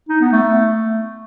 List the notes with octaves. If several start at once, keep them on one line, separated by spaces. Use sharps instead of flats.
D#4
B3
A3